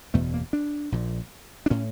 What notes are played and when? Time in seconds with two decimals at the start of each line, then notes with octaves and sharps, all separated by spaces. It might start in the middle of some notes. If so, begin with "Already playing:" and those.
0.14 F#1 E2 B2 A3
0.34 A#3
0.53 D4
0.92 A#1 A#2
1.66 D4
1.70 A2 C#4